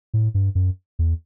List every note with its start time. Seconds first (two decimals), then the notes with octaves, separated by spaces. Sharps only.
0.14 A2
0.34 G2
0.55 F#2
0.99 E2